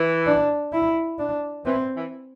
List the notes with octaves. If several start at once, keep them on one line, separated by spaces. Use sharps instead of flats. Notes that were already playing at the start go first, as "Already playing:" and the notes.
Already playing: E3
D4
E4
D4
E3 C4
E3